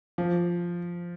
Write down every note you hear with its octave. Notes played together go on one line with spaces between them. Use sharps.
F3